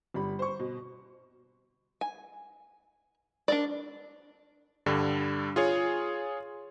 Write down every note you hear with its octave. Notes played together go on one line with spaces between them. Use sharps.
G1 G3 B5
C5 C#6
B2
G#5
D4 A#4 D5
G2 D3 G3
F4 G#4 C#5